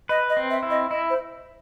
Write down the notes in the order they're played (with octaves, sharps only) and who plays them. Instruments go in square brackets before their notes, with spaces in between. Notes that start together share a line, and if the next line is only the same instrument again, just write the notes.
[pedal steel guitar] B4 [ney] D#5
[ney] D#5
[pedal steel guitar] C4
[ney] E5
[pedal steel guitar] E4
[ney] D#5
[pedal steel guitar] E4 [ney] D#5
[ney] C5